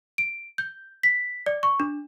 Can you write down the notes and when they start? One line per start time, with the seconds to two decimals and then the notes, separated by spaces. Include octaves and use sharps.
0.18 D7
0.58 G6
1.03 B6
1.46 D5
1.63 C#6
1.80 D4